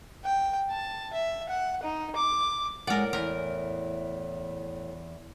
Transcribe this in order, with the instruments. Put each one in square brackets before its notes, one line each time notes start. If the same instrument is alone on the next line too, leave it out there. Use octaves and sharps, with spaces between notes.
[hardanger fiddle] G5
A5
E5
F#5
D#4
D6
[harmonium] A2 [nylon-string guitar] G#3 F#5 [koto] A#4 D5
[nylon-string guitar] E2 [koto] A#4